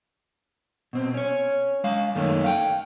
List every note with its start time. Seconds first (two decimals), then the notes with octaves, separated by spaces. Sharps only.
0.93 B2 C4
1.14 C#4 C#5
1.84 G#3 F5
2.15 F#2 D#3 A3 A#3 C#4
2.44 F5 G5